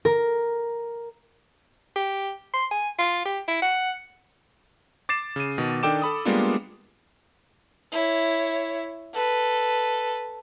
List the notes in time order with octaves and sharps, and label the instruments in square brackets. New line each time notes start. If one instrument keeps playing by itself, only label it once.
[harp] A#4
[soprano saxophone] G4
C6
G#5
F4
G4
E4
F#5
[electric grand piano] D6 A6 C7 E7
C#3 D#7
B2 D#3
D#3 D4 A4 G5 D6 E7
A4 B5 D#6
G3 G#3 A#3 B3 D4 F4
[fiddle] E4 C#5
A4 B4